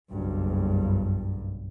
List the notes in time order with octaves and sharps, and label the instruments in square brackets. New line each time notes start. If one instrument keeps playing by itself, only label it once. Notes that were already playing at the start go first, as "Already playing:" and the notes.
[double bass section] F#1 B1 G2